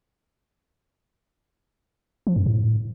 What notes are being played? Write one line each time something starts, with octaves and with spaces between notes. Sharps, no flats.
F3
F#2
A2